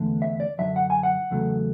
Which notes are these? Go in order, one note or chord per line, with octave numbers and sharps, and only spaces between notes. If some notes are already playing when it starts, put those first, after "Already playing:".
Already playing: E2 D3 A3
E5
D5
F#2 D3 F#3 E5
F#5
G#5
F#5
E2 C#3 F#3 A3